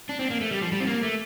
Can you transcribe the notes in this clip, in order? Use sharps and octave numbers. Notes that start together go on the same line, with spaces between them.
D4
C4
A#3
A3
G3
F3
G3
C4
A#3
A3